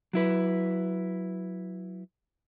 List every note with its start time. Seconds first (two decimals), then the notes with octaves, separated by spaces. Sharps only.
0.13 F#3 E4 B4